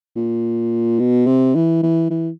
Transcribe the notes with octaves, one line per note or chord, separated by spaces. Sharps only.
A#2
B2
C3
E3
E3
E3